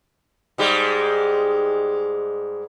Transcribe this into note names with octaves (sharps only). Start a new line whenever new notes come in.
G#2 G3 G#3